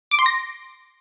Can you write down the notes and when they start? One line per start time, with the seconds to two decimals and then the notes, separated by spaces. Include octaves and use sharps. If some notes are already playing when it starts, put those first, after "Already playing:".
0.11 D6
0.19 C6
0.26 A#6